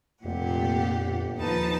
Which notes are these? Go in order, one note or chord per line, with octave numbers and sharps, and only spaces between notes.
F1 F2 A#2 G4 F#5
G1
D#2 F3 D#4 B4 A5